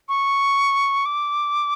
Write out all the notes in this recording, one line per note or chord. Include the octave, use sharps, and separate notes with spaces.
C#6
D6